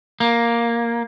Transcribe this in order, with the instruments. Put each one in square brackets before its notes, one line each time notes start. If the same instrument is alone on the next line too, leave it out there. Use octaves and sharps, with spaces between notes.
[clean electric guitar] A#3